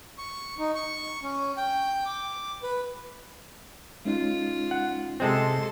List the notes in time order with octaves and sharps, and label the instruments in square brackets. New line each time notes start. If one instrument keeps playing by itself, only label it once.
[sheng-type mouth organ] C#6
D#4
C#6
C#4
G5
D6
B4
[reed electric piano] G#3 C#4 D#4 [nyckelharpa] F4
[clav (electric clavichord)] F#5
[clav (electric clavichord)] C3 G#3 C4 [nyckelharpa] A4 C6